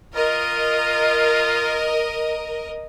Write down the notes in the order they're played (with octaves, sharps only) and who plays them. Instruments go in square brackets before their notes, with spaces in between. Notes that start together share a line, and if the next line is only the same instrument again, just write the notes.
[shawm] F4 [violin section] A#4 D#5